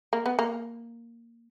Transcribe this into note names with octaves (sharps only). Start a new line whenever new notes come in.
A#3
B3
A#3